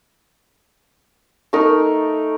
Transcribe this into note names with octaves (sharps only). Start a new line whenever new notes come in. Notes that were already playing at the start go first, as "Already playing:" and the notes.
A3 D#4 A#4